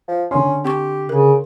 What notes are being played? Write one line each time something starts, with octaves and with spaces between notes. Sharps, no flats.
F3
D3 C#4 C6
C4 G4 G5 C#6
C#3 A#4